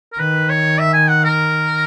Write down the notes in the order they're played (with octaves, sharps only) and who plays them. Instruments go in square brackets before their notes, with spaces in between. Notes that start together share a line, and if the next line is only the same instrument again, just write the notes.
[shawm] A#4
[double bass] D#3 [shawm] B4
[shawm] C#5
E5
G#5
F#5
A#4